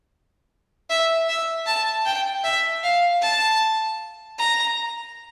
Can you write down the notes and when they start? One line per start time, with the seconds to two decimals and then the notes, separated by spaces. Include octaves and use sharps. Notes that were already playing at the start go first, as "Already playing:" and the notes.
0.90 E5
1.29 E5
1.66 A5
2.06 G5
2.44 E5
2.84 F5
3.22 A5
4.38 A#5